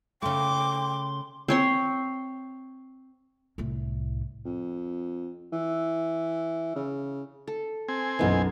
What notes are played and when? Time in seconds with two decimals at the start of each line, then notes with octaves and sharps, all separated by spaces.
0.22 C#3 A3 G5 C6 D6
1.48 C4 C#5 C6
3.58 C2 A2
4.45 F2
5.53 E3
6.76 C#3
7.48 A4
7.88 C4 G#5
8.19 B1 F#2 E3 B3 D#5